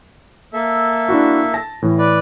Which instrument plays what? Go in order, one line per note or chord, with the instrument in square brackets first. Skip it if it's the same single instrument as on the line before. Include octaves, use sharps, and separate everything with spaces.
[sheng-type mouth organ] A#3 A4 E5
[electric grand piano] D4 E4 F#4
A5 A#6
A2 E3
[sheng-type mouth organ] B4 D5